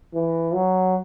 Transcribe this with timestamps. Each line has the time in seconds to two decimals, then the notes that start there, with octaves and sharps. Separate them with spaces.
0.14 E3
0.54 F#3